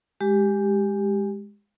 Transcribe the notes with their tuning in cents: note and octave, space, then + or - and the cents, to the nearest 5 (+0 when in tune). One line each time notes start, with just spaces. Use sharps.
G#3 -10 G4 +0